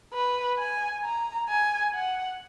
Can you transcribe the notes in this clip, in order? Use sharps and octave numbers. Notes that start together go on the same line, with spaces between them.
B4
G#5
A#5
G#5
F#5